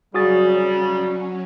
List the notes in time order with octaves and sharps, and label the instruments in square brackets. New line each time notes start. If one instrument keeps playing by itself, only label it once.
[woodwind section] C#3 G3 [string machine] F#3 C#4 [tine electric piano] F#4 D#6 A6 [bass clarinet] G#4